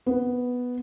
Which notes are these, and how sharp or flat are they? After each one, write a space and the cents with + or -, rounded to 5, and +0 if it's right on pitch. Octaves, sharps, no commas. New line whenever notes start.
B3 +0